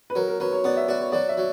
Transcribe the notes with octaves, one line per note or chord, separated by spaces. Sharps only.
B4
F#3 A#4
A#4
F#3 B4
C#5
B3 D5
E5
F#4 D5
C#5
F#3 D5
E5
F#3